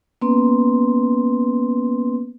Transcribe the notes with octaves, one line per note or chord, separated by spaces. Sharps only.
A#3 B3 C#4 B4 C6